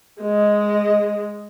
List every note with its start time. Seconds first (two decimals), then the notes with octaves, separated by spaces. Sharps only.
0.22 G#3 D#5